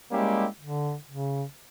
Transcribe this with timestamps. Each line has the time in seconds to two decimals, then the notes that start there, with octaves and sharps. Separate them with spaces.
0.11 G3 G#3 A#3 C#4 E4 G4
0.61 D3
1.09 C#3